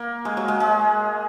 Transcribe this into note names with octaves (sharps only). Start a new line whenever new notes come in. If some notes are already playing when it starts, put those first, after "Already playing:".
Already playing: A#3
G#3
F#3
G#3
G#3